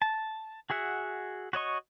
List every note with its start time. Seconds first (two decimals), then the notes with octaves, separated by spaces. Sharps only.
0.02 A5
0.70 F#4 G#4 E5 F#5
1.53 F#4 C#5 D#5 C#6